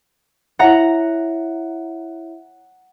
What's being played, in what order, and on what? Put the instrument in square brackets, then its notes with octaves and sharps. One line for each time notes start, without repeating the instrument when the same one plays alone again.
[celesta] E4 C#5 E5 [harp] F#5 A#5 A#6